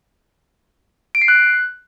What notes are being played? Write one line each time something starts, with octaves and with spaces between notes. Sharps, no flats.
D7
C7
F#6